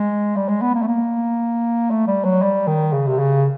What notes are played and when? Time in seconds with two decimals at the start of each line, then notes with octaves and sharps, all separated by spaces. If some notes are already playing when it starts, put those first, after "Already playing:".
Already playing: G#3
0.36 G3
0.48 G#3
0.62 B3
0.74 A#3
0.82 A3
0.87 A#3
1.90 A3
2.07 G3
2.24 F#3
2.42 G3
2.67 D#3
2.93 C#3
3.07 C3
3.19 C#3